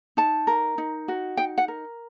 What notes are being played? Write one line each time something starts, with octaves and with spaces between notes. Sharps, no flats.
D#4 A5
A#4
D#4
F#4
D#4 G5
F#5
A#4